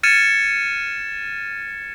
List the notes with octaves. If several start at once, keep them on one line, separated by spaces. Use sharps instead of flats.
F6 G#6 A6 C#7 D#7 E7